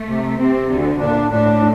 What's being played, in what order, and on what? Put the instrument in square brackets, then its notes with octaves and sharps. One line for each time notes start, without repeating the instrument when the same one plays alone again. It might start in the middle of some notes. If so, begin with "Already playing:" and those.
Already playing: [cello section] A3
[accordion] C3
[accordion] C3 [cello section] C4
[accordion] D2 [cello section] D3
[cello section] A#2 [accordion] D4
[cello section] A2 [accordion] D4